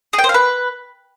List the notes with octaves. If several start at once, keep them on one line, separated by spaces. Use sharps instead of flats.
G#4
G5
C5
F5
B4